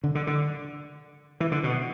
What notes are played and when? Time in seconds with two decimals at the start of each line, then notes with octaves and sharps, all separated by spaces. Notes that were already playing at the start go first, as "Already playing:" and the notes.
0.04 D3
0.15 D3
0.27 D3
1.40 E3
1.52 D3
1.63 B2